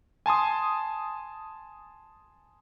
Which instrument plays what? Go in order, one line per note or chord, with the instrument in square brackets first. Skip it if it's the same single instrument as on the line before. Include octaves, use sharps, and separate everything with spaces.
[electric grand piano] G#5 A5 C6 D#6